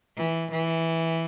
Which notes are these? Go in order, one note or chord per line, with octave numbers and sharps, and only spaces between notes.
E3
E3